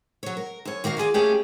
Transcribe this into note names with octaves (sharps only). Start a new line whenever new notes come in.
F#3 C#5
A#4
F#2 C#5
D#3 A#3 F#4 F5
E4 F4 G#4 D5
A3 A#3 C#4 G4 G#4 C#5